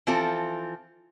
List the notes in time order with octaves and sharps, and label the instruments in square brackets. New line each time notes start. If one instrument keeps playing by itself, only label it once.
[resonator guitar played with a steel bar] E3 F3 C4 F4 A4